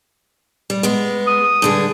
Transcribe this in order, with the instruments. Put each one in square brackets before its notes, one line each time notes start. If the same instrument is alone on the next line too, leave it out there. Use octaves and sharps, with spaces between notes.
[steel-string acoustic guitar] G3
G#3 B3
[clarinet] D#6
[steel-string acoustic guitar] G2 D3 G#4